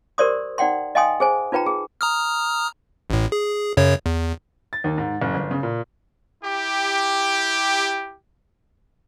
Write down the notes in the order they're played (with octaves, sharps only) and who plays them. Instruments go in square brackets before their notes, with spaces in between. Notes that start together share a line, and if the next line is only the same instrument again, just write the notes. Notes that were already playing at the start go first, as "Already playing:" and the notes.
[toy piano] G4 A#4 C5 D5 C6 D#6
D#4 D5 F#5 G5 C6
D#5 F5 G5 G#5 C6 D#6
G#4 C5 G#5
D#4 F4 B4 G5 A#5
G#4
[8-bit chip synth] A#5 D#6 F6
A1 A2
G#4
F#2 C#3 C#5
E2
[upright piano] A6
D#2
G#2
F#1
G1
C#3
A#2
[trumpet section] E4 G4